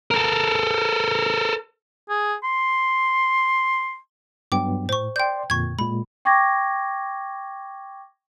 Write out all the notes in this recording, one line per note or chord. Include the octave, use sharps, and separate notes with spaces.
A4 A#4
G#4
C6
G2 F#3 B3 G5 D6
A2 C5 C#6
D5 G5 C6 G6
F2 A#2 D3 C#6 G#6
A#2 G#3 B5
G5 C#6 D6 G#6 A#6